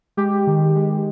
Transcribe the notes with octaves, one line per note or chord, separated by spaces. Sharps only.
G#3 G4
D#3
G#3